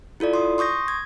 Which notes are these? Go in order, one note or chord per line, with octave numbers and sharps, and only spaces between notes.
E4 F4 A4 D5
C6 D#6
C6 C#6 D#6 G6 A#6
G#6